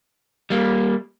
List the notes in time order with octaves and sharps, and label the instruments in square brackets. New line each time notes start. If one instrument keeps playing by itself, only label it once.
[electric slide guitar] G3 A#3